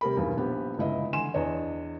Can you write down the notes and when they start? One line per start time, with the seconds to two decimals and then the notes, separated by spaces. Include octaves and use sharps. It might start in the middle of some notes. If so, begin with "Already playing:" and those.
0.01 C3 G3 A#4 B5
0.16 B1 E2 G2 B2
0.37 A#1 B3 G4
0.78 G1 C#2 E4 D#5
1.13 D3 E3 G#5 C6 E7
1.34 E2 D4 C#5 D#5